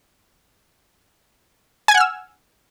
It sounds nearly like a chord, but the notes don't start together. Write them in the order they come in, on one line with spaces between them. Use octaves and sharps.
G#5 G#6 F#5 F6 E6